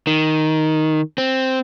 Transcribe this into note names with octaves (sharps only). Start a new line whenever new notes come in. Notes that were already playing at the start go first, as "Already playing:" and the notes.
D#3
C4